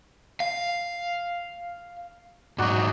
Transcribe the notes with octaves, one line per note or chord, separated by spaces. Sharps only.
F5
G#2 F#3 D#4 F#4 D5